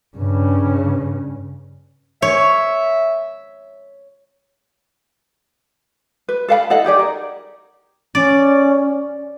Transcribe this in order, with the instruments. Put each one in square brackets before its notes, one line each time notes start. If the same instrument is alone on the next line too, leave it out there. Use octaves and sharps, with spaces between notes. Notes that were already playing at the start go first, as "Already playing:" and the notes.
[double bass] G2 C#3
[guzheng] C#5 [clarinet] E5
[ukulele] B4
A4 F5 F#5 B5
E4 A4 D#5 F#5
D#4 G4 G#4 D5
A#4
[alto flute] C#4 [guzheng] D5